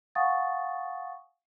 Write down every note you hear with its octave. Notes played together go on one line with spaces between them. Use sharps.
F5 F#5 G#5 C#6 D#6 A6